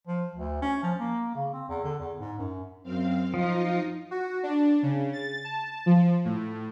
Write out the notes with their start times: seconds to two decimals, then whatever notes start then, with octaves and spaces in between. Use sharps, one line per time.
0.07 F3
0.35 D2
0.62 C#4
0.83 F3
0.99 A#3
1.35 C#3
1.53 C4
1.69 E2
1.84 D3
1.99 E2
2.20 G#2
2.39 F#2
2.83 F#2 C4 F5
3.34 F3 D#4 F4 D#5
4.11 F#4
4.43 D4
4.83 C#3
5.13 A6
5.44 A5
5.86 F3
6.25 A2